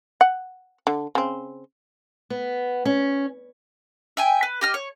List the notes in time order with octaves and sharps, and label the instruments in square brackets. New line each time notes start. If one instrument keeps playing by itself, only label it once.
[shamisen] F#5
D3
C#3 C4
[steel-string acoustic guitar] B3
C#4
[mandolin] E5 G5 G#5
B4
G4 D#5 F6
C#5